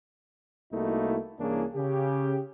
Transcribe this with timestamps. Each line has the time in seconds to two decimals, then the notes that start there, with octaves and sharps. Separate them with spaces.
0.72 C2 A3 A#3 D#4 E4 F#4
1.39 C2 E3 A#3 C#4 D4 G#4
1.75 C#3 G4